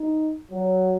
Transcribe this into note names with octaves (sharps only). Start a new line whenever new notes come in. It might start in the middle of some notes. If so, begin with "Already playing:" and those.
Already playing: D#4
F#3